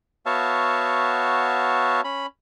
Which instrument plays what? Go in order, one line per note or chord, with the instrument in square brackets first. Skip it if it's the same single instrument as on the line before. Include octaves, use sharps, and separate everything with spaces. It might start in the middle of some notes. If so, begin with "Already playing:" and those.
[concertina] B3 F#4 C#5 E5 F5 A5
C#4 B5